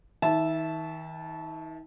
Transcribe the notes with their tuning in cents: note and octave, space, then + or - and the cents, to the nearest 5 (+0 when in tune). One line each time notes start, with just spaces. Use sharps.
D#3 +45 E5 +0 A5 -15